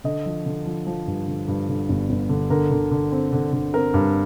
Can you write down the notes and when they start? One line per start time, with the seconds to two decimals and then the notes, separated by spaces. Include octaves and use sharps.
0.04 D3 D#5
0.26 F3
0.46 D3
0.66 F3
0.87 F3
1.07 G2
1.28 D3
1.48 G2
1.69 D3
1.89 G1
2.09 G1
2.29 D3
2.50 D3 A#4
2.71 D3
2.91 D3
3.12 C4
3.33 D3
3.53 D3
3.74 C4 A#4
3.94 G2